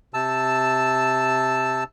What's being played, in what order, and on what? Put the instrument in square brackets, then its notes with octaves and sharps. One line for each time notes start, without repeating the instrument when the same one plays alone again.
[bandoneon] C3 A5 E6